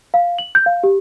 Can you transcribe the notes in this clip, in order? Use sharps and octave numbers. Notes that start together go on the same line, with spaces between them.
F5
F#7
G6
F5
G4